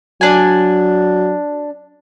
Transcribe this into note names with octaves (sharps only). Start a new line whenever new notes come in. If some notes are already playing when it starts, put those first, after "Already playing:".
F#3 D4 G#5